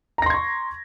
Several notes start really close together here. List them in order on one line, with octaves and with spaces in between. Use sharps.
A#5 A#6 C6 G#6 C#6